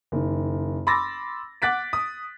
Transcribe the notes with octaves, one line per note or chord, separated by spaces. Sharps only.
F#1 D#3
B5 C6 D6 E6 A6 A#6
F#5 D6 F#6 A6 B6 D7
D#6